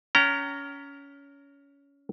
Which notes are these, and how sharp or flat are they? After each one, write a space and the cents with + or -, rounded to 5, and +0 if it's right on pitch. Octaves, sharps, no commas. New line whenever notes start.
C#4 +20 G5 -30 A#5 -15